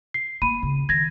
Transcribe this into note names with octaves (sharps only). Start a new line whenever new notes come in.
C7
A3 A#3 B5 D#7
A#2 C#3
D#3 G#6 A#6